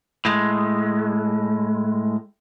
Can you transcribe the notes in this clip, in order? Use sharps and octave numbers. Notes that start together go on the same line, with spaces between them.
A2 G#3